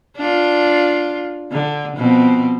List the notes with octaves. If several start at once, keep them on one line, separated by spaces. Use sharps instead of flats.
D4 F4
D3
B2 F3 C4